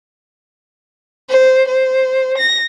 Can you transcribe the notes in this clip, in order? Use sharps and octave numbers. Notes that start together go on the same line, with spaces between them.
C5
C5
A#6